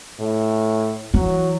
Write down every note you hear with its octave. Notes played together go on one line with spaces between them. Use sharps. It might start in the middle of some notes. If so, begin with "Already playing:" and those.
A2
E3 F#3